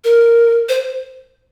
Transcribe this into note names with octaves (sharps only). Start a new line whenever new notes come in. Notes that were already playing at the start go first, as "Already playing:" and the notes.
A#4
C5